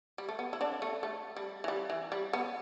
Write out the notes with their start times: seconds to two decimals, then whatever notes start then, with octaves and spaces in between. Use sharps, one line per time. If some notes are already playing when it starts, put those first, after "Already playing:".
0.18 G3
0.29 A3
0.39 B3
0.53 E4
0.61 D3 D4
0.82 A3
1.03 A3
1.37 G3
1.64 E3
1.68 G3
1.90 E3
2.12 G3
2.33 B3